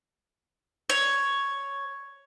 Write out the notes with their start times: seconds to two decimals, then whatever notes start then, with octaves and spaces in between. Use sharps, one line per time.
0.90 C#5